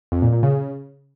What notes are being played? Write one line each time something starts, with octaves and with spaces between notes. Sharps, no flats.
F2
A#2
A#2
C#3